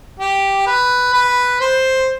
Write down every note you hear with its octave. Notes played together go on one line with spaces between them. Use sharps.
G4
B4
B4
C5